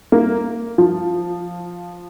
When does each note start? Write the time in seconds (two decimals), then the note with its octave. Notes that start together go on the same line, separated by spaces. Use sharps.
0.12 A#3
0.78 F3